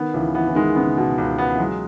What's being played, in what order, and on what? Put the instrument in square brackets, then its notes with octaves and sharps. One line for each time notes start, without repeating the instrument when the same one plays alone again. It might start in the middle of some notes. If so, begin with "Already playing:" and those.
Already playing: [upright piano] D#3 [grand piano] B3
[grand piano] C#2 [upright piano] E3
[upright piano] E3 [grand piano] B3
[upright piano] E3
[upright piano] D#3 [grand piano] G#3
[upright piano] C#3 [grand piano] B3
[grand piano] B2
C#2
B3
[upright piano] E3
[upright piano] F#3 [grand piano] G#3